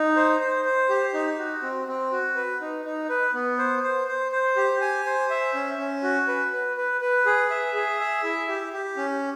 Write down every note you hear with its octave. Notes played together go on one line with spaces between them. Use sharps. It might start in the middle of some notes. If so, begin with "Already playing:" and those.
Already playing: D#4
C5
C5
C5
G4
D#4
F#4
C4
C4
F#4
B4
D#4
D#4
B4
B3
C5
C5
C5
C5
G4
G#5
C5
E5
C#4
C#4
F#4
B4
B4
B4
B4
G#4
E5
G#4
E5
E4
G4
G4
C#4